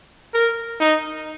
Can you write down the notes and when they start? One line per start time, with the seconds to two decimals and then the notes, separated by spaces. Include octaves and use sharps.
0.34 A#4
0.80 D#4